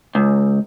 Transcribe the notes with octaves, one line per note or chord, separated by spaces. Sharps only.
C#2